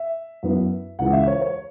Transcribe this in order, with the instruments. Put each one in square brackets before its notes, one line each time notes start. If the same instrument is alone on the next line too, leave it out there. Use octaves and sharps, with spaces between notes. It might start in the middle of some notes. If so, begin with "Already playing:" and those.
Already playing: [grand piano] E5
F#2 F#3 B3 E4
C#2 C#3 E3 C#4 F#5
E5
C#5
C#5